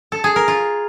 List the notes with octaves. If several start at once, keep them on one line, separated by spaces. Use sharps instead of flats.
A4
G#4
A#4
F4